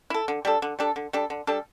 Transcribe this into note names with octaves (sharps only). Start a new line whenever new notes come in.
E4 A4
D3
G3 D4 A4
D3
G3 D4 A4
D3
G3 D4 A4
D3
G3 D4 A4